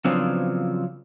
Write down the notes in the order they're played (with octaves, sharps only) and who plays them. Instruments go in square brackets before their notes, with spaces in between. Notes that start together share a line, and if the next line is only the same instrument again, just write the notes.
[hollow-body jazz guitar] C#3 F3 F#3 B3 C4 D4